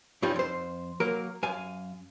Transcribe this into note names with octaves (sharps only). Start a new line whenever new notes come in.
G2 F3 G3 C#4 D#4 F4
F2 C5
F#3 A#3 A#4
F#2 F5 G#5